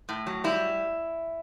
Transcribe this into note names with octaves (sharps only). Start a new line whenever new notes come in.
A2
F#3
G3 E4